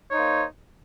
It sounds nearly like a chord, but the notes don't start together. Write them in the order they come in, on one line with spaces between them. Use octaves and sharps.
C#5 D#4 C5 A#3